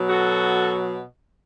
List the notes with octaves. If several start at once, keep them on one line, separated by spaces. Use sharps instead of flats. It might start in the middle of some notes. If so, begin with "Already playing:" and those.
Already playing: B2 F#3
F#4 A4